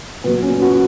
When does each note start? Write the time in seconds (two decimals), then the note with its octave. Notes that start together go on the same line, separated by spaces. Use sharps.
0.24 A#2 F#3 B3
0.42 C#4
0.62 F#4